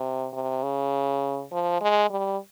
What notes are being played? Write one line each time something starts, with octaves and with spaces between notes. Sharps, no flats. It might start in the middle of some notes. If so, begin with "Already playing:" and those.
Already playing: C3
C3
C#3
F3
G#3
G3